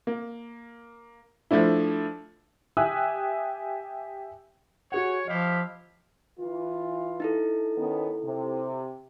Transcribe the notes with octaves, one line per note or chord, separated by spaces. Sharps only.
A#3
F3 A3 D4 E4
G4 E5 G#5 D#6 E6 F#6
F#4 G#4 C#5 F#5
F3 E4 G4 D#5 F5
E3 F4
D#4 E4 A4
D#3 B3 C#4
C3